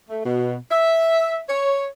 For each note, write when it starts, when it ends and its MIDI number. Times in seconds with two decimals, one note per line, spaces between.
0.09 0.23 57
0.26 0.56 47
0.71 1.40 76
1.49 1.87 73